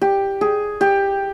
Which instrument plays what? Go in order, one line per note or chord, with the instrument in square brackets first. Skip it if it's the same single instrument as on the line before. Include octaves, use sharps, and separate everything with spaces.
[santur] G4
G#4
G4